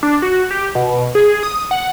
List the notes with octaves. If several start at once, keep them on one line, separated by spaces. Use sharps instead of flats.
D4
F#4
G4
B2
G#4
D#6
F#5